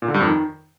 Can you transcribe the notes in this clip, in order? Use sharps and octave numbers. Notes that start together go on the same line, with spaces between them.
A#2
D3
G2
F2
D#3